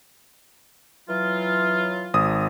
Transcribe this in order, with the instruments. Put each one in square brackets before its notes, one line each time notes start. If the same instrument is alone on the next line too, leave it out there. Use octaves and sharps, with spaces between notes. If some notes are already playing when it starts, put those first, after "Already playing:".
[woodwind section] E3 F#3 F4
[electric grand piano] G#1 D#6